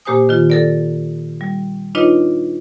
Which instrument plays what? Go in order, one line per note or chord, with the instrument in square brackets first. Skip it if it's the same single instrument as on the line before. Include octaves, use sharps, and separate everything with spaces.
[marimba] A#2 A#3 G4 C5 G#5 D#6
D#3 F4
A4 A#4 D5
G3
D4 D#4 F4 B4 C#5 D#5